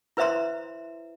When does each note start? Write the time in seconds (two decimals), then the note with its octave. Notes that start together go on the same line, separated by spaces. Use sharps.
0.17 E4 B4 C5 E5 A#5 C6